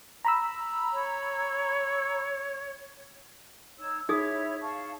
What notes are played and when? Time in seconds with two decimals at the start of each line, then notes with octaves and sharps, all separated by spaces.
0.25 A#5 B5 E6
0.93 C#5
3.79 D#4 C#5 E6
4.09 D#4 E4 G#4 C#5 E5 D#6
4.61 F5 A5 C#6